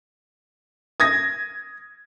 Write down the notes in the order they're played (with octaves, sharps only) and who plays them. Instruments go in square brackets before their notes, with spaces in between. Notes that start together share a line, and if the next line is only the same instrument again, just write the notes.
[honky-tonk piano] D#6 G#6 A#6